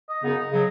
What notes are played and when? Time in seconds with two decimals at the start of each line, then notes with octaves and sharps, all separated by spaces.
0.08 D#5
0.23 F#2 C#3 B3 D#4
0.52 C#3 F#3